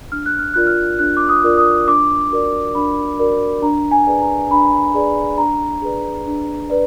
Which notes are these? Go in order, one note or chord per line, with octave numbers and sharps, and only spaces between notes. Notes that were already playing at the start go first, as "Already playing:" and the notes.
D4 F6
F#6
F6
F4 A#4 D5 F#6
F6
D4 F#6
D6
D#6
F4 A#4 D5
D#6
D4 D6
F#4 A#4 D5
D4 B5
F#4 A#4 D5
D4 A#5
G#5
G#4 B4 D5
A#5
D4 B5
G#4 B4 D5
D4 A#5
G#4 B4 D5
D4
B4 D5